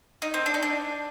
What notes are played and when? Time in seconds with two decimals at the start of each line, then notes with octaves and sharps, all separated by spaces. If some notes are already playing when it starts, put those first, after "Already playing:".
0.22 D#4
0.34 C4
0.46 D4
0.54 D#4
0.63 D4